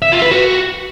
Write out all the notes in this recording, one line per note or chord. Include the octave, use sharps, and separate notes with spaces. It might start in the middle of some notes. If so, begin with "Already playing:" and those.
E5
F4
B4
F#4